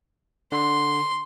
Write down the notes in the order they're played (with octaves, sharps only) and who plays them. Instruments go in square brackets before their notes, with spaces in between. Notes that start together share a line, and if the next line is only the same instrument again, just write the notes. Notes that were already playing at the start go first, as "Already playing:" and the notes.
[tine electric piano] D3 [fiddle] C6